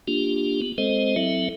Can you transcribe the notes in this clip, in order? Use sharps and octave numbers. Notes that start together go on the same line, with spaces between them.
A#3 D4 F4 G4
B3
G#3 C4 A4 C5 D#5
F#3 C4 E4 A4 E5